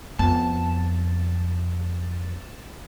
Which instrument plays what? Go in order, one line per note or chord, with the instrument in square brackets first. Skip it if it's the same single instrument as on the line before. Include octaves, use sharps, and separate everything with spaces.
[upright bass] F2 B3 [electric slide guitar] A5